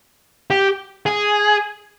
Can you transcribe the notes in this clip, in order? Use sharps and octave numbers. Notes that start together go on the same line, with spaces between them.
G4
G#4